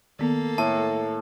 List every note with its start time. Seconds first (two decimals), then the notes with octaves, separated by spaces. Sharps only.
0.19 D#3 A#3 B3 A4
0.58 A2 A5